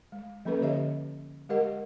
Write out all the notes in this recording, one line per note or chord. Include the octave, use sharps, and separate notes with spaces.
G#3
F3 A#3 C#4 A4 B4
D3 G4 C#5 D#5 E5
G#3 G4 A#4 D#5 F#5